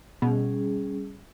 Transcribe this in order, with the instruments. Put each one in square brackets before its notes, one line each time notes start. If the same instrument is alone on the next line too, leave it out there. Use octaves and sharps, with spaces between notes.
[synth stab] B2 [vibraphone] G3 C#4 G#4